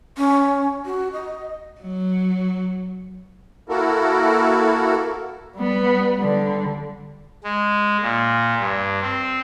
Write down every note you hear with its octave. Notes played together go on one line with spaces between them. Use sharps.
C#4
F#4
D#5
F#3
A#3 E4 F#4 A4 A#4
G3 B3
D3 G3
G#3
A#2
G2
C4